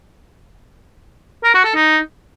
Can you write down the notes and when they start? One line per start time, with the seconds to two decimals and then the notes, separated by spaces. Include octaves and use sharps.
1.44 A#4
1.54 F#4
1.64 A4
1.75 D#4